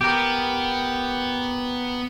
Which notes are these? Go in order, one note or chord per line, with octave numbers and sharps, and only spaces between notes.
B3 G4 A#4